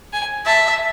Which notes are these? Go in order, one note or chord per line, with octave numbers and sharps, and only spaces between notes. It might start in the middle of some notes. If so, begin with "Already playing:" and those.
G#5
E5 A5